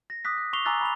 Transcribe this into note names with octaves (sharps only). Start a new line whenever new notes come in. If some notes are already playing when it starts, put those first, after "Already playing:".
A#6
D6 D#6 F#6 B6
F#6
C#6 D6 E6 C7 F7 G7
G#5 A#5 D6 E6 F#6 A6
B5 D6 F7